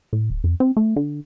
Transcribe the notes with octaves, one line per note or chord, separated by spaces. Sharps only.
A2
D1
F2
C4
A3
D3